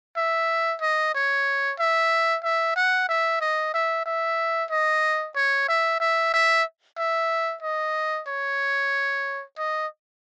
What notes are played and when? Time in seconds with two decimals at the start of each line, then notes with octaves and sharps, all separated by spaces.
0.17 E5
0.81 D#5
1.15 C#5
1.80 E5
2.44 E5
2.76 F#5
3.09 E5
3.41 D#5
3.74 E5
4.06 E5
4.70 D#5
5.36 C#5
5.69 E5
6.00 E5
6.33 E5
6.98 E5
7.63 D#5
8.27 C#5
9.58 D#5